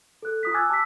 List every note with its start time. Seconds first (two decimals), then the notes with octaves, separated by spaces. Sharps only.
0.22 A4 F#6
0.43 F4 D#6 B6
0.54 G#5 D6 E6 F#6 G#6 A6
0.69 A5 D6 E6 B6